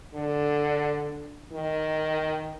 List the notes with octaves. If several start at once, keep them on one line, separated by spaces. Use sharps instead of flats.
D3
D#3